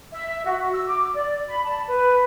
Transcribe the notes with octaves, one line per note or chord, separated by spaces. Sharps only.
E5
F#4
E6
D6
D5
B5
A5
B4